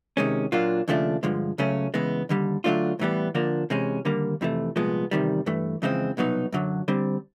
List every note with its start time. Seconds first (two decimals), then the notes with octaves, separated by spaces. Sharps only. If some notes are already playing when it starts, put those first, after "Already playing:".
0.17 C3 D#3 G#3 C#4
0.52 A#2 F#3 A#3 D4 F4
0.88 D#2 C#3 F3 A3 D4
1.23 G2 D3 F3 G#3
1.58 C#2 C#3 F#3 A3 C#4
1.94 C#3 E3 G#3 B3
2.29 D#2 D3 G3
2.64 D3 F#3 A3 D4 F4
2.99 A2 E3 G3 B3
3.35 D3 F3 A#3 D4
3.70 C3 E3 G#3 C#4
4.05 D#2 D3 G3 A#3
4.41 F2 C3 E3 A3
4.76 C2 A#2 F3 G#3 B3
5.11 E2 C3 D#3 G3
5.46 G2 E3 A3
5.82 F2 C#3 E3 G#3 C4
6.17 C2 B2 F#3 B3 D#4
6.52 F#2 D3 F#3
6.88 D3 G3 C4